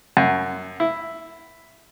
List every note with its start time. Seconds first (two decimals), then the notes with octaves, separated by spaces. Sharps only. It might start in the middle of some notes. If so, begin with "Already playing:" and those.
0.17 F#2
0.80 E4